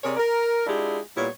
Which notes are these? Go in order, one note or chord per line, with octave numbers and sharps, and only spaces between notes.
C3 G#4 A#4 C#5 D5
A#4
G#3 D4 E4 F4 G4 G#4
A#2 G3 B3 E4 C#5